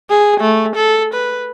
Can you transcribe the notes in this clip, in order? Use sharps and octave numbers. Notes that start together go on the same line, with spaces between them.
G#4
A3
A4
B4